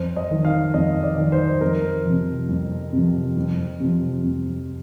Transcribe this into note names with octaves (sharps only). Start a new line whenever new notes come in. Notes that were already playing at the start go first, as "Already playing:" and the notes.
Already playing: F2 C5
D#5
D#3
F5
F2 D#5
D5
D#3
C5
F2 A#4
C3 F3
F2
C3 F3
F2
C3 F3
F2